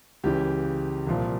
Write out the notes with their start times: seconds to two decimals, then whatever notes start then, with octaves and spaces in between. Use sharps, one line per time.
0.24 C#2 C#3 E3 G4
1.07 C2 A#2 F3